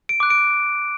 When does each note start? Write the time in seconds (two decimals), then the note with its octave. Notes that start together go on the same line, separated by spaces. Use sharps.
0.09 D7
0.20 D6 F#6
0.30 D7